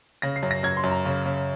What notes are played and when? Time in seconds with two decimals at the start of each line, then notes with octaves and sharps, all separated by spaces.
0.22 C#3 A#6
0.36 C7
0.43 F#2
0.51 A#6
0.63 F#2 G#6
0.77 C6
0.84 F#2
0.91 A#5
1.05 C#3
1.26 C#3